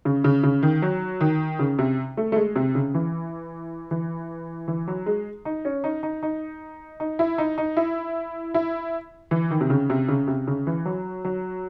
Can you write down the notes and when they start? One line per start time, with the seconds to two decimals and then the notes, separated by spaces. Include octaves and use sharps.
0.05 C#3
0.24 C#3
0.44 C#3
0.63 D#3
0.82 F#3
1.21 D#3
1.59 C#3
1.79 C3
2.17 A3
2.32 A3
2.36 G#3
2.56 C3
2.75 C#3
2.94 E3
3.91 E3
4.68 E3
4.88 F#3
5.06 G#3
5.45 D#4
5.65 C#4
5.84 D#4
6.03 D#4
6.23 D#4
7.00 D#4
7.19 E4
7.38 D#4
7.58 D#4
7.77 E4
8.54 E4
9.31 E3
9.51 D#3
9.61 C3
9.70 C#3
9.90 C3
10.08 C#3
10.28 C3
10.47 C#3
10.67 E3
10.86 F#3
11.25 F#3